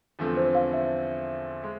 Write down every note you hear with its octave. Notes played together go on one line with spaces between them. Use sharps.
E2 D3 F3 A3 C4
C5
F5
E5
G#3